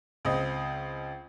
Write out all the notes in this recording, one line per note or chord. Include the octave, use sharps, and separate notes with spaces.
C#2 C4 D#5